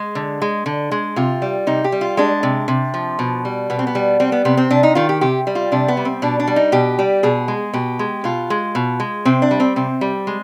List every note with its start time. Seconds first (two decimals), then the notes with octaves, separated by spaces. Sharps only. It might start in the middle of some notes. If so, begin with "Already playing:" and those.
Already playing: G#3
0.15 D3
0.42 G#3
0.66 D3
0.91 G#3
1.16 C3 F4
1.42 G3
1.67 C3 D#4
1.84 G4
1.92 G3
2.01 F4
2.17 G#3 D4
2.43 C3
2.68 C3
2.94 F3
3.19 B2
3.45 G3
3.70 B2 B3
3.79 C4
3.87 B3
3.95 G3
4.20 G3 C4
4.32 B3
4.45 C3 B3
4.57 C4
4.71 C3 D4
4.83 D#4
4.95 D#3 F4
5.09 G4
5.21 C3 G4
5.47 G3
5.55 F4
5.72 C3 D4
5.88 B3
5.97 G3
6.05 C4
6.22 B2 D4
6.40 D4
6.48 G3
6.56 D#4
6.72 B2 G4
6.99 G3
7.23 B2 G#4
7.48 G#3
7.73 B2 G4
7.99 G#3
8.24 B2 F4
8.50 G#3
8.75 B2
9.00 G#3
9.25 C3 C4
9.42 D4
9.51 G3
9.60 C4
9.76 C3 C4
10.01 G3
10.27 G#3